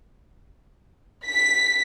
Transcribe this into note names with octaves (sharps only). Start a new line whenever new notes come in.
B6